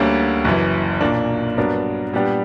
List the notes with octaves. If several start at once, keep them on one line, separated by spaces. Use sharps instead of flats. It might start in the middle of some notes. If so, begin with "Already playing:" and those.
Already playing: D2 D3 G3 A#3 C#4
F#1 F#2 E3
B1 A#2 A#3 D4
G2 F#3 B3 D4 A#4
A#2 G3 B3 D4 G4